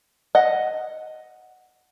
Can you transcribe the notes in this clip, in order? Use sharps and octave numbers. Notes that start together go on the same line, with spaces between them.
D#5 F#5